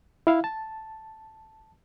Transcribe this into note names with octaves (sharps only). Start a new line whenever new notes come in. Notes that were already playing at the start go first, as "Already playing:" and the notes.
E4 E5 F5
A5